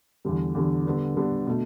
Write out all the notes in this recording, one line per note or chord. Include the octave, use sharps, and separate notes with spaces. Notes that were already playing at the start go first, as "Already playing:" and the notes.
E2 D3 G3
E2 D3 G3
D3 G3 B3 D4
D3 G3 B3 D4
B2 A3